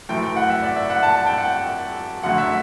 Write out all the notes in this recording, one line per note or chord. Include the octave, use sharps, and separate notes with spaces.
F#2 E3 A3 G5
G5
F#5
E5
D5
E5
F#5
A5
A5
G5
F#5
G5
F#2 D3 A3 F#5
E5